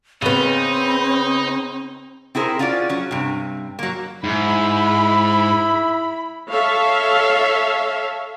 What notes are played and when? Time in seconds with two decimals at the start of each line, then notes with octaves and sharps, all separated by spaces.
0.22 C#3 B3 C4 D#4 B5
2.35 C4 E4 G#4 A#4 C5
2.59 C#4 F4 F#4 G#4 D5
2.89 F#3 C#4
3.11 G2 C3
3.79 F#3 A#3
4.24 G#2 E4 B5
6.51 A4 C#5 E5 F5